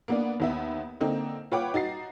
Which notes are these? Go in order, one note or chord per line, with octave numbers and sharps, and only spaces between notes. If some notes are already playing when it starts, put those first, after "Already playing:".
A#3 B3 D4
D#2 B3 E5
D3 A#3 C4 D#4
F4 B4 C#5 F#5 G5 D6
D#4 F#4 A6 C7